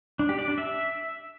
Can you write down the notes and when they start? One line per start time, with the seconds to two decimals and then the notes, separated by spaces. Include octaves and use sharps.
0.19 D4
0.29 G4
0.39 D5
0.48 D4
0.58 E5